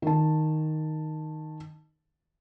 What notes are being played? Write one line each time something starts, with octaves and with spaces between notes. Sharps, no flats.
D#3 A5